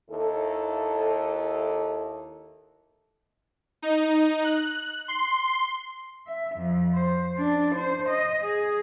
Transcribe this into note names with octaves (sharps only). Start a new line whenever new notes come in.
D#2 E4 A4
D#4
F#6
C6
E5
F2
C5
D4
C5
D#5
G#4